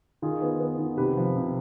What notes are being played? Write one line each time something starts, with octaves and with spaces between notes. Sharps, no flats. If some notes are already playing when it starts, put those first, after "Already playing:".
D#3 F4 G#4
B3
B3
D#3
C3 G4 B4
F3
C3